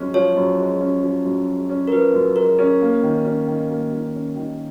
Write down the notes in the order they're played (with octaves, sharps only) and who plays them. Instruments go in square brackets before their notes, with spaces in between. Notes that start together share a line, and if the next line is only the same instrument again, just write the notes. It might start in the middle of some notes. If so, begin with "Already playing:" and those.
Already playing: [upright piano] F#2 F3 G#3 C#4
[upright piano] F3 [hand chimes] C#5
[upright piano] F#2
G#3
C#4
F3
F#2
G#3
C#4
[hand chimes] A#4
[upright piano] F3 [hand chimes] B4
[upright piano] F#2
[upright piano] G#3 [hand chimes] A#4
[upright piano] C#4
A#3
D#3
C#4
D#3
A#3
D#3
C#4
D#3